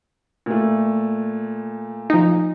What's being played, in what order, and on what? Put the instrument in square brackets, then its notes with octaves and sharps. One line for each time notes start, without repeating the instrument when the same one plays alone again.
[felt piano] A#2 A3
[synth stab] F3 D#4